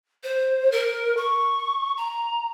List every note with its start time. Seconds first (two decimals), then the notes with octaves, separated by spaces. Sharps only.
0.24 C5
0.72 A#4
1.17 C#6
1.97 A#5